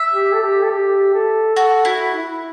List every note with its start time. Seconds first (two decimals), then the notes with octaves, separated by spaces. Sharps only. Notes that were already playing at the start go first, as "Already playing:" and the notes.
Already playing: E5
0.13 G4
0.33 A4
0.42 G4
0.63 A4
0.71 G4
1.14 A4
1.56 F#4 A4
1.85 E4 F#4
2.14 E4